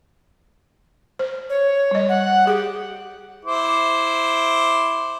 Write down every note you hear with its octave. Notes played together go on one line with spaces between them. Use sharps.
C5
C#5
G3 D#5
F#5
G4 G#4
E4 C5 D6